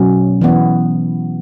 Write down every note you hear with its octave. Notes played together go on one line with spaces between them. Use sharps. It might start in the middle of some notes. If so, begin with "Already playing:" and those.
Already playing: B2 F#3 C#4
E3 B3